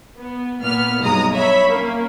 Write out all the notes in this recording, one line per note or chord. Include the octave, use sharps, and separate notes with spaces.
B3
A#2 B3 F6
B1 G2 G#3 A#5 D#6
C#5 E5 B5
A#3 C#4